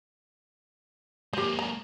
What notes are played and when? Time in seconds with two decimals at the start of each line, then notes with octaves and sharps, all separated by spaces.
1.33 G#3 A#3 G4 C5
1.59 A#5